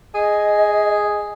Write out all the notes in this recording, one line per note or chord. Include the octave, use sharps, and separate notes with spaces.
G#4 D#5